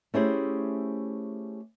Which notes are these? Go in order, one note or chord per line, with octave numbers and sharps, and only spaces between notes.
A3 C#4 E4 G4 G#4 C5